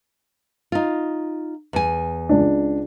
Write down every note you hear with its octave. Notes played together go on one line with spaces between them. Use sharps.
D#4 F4
E2 G#5
C#2 D4